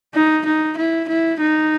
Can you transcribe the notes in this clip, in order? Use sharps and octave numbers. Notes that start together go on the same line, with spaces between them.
D#4
D#4
E4
E4
D#4